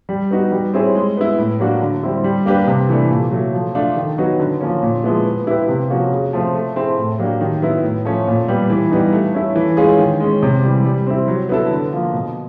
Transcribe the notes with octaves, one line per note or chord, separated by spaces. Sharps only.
G3
B3 D#4 F#4
G3
C4 E4 G#4 C#5
G#3
B3 E4
A2
F#3 A#3 D4 F#4
D3
G3 C4 E4
G3
A#3 D4 G4 B4
C3
E3 A3 D4
A#2
F#3 A3
F3
A3 D4 F4
D#3
F#3 B3 D#4 F#4
D3
F3 A#3 C#4
A#2
F3 G#3 B3 E4
B3
E4 G4 B4
C3
F3 A#3 C#4 F#4
C#3
F3 A3 C4 F4
A3
C4 E4 G#4
A2
F#3 A#3 D4 G4
D#3
F#3 B3 E4
A2
F3 A3 C#4
A#2
G3 B3
E3
G3 B3 D#4
A3
C#4 E4
E3
G#3 C#4 F4 G#4
D#3
G#3 C#4
C3
E3 G3
G3
C4 E4
F#3
B3 E4 A4
D3
F3 A#3
B2